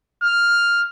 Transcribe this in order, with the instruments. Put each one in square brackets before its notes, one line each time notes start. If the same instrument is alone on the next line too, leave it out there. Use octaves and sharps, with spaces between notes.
[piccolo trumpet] F6